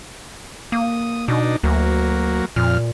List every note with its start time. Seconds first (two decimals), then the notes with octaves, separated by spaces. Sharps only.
0.72 A#3 D#6
1.28 B2 D4 D#4
1.63 D2 F#3 A#3
2.56 F2 A#2 F6